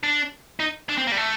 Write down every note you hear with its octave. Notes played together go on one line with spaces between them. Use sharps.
D4
D#4
D4
C4
A#3
G3
A3